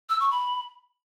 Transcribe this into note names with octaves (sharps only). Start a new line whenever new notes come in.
E6
C#6
B5